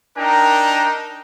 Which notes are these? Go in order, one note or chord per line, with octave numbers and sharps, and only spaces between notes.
D4 D#4 A#4 G5 A#5